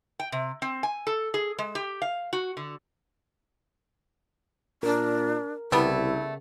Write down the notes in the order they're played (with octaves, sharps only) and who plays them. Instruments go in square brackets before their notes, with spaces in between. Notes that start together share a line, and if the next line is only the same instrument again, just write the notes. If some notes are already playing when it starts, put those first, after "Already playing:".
[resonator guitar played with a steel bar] G5
C3
C4
G#5
A4
G#4
G#3
G4
F5
F#4
D3
[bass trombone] A#2 [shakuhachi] D4 [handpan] A#4
[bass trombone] C2 [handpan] C#3 [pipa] G3 A3 B3 [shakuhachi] E4